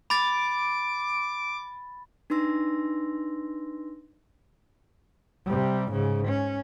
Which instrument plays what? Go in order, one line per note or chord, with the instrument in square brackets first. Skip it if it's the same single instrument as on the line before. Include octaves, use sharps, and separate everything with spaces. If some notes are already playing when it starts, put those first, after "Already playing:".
[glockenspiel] B5 A6 [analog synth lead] D6
[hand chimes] D4 D#4 B4 C6 E6 A#6
[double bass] C3 G3
G#2 C#3
C#4